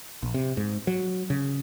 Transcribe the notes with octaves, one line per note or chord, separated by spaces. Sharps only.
A#1
C3
G#2
F#3
C#3